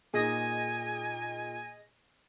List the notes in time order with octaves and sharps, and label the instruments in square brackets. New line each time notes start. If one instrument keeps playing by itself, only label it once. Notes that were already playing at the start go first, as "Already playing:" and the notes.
[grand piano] A#2 D#4 [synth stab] G#4 D#5 A#6 [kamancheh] G#5